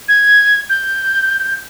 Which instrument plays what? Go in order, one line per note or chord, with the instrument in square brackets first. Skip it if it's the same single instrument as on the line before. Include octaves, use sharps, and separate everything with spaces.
[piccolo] G#6
G6